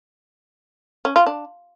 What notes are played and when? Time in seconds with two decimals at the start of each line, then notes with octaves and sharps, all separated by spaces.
1.05 C#4
1.16 F4
1.27 D4